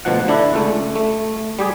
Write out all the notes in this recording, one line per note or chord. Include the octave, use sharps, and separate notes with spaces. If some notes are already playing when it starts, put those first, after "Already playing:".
D2 B2 F3 F#5
D3 D4 E4
C#2 A3
A3
G3 G4 G#4